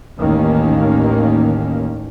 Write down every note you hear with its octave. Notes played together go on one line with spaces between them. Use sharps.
A1 D#2 D#3 A#3 C#4